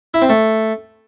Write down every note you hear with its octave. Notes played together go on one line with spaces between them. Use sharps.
E4
C4
A3